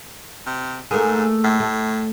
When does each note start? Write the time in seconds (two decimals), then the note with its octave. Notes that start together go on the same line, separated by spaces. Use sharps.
0.47 C3
0.91 G#2 A3 A#3 G#4
1.44 A2
1.60 A3